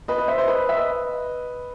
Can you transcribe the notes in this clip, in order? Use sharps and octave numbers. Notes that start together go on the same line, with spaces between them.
B4 D#5
D#5
C5 E5
C5
B4 D#5
E5
B4 D#5